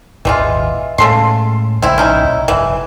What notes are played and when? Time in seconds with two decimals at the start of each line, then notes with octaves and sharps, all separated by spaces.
0.25 G#1 D#2 A#2 E3 G#3 F4
0.98 A2 C#3 G#3 A4 C6
1.82 A#1 C#3 G#3 C4 E4
1.98 A#1 A2 C#4 D#4 E4
2.24 B1
2.48 F1 G2 E3